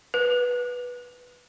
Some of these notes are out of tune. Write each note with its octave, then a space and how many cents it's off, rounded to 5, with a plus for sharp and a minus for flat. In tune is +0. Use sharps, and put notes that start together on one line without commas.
B4 -10